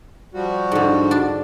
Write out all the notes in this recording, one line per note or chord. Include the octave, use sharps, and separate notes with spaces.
F3 G3 F#4
G#2 D3
D4